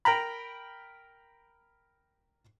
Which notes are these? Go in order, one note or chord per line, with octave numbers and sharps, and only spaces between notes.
A#4 G5 A#5 B5